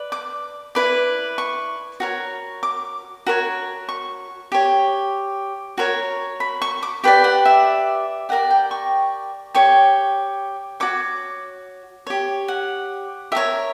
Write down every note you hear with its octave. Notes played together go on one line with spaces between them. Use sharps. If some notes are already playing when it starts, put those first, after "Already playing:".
Already playing: B4 D5
D6
E4 B4 D5
C#6
F#4 A#4 C#5
D6
F#4 A#4 C#5
C#6
G4 C#5
F#4 A#4 C#5
B5
C#6
D6
G4 B4 D5 G5
F#5
E5
G4 A#4 D5 F#5
G5
C#6
G4 C#5 C#6
F#4 C#5 D6
G4 C#5
F#5
G4 A#4 C#5 E5